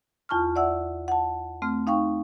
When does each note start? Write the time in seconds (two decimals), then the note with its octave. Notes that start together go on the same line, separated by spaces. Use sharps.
0.29 E2 F4 A5 C#6 F6
0.56 D5 E5 F#5 E6
1.08 F#5 A5
1.62 A3 C4 F6
1.87 D#4 F5 G5 C#6